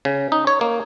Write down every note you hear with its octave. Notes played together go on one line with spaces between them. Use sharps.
C#3
D#4
C#5
A#3